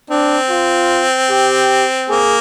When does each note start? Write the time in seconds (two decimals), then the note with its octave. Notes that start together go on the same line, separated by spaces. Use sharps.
0.10 C4 D4
0.50 F4
1.30 G4
2.09 A#3 G#4